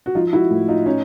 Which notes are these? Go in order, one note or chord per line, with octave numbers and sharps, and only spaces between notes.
F#4
F3 D#4 F4
E4 F#4
A2
D#4 F4
C#4 D#4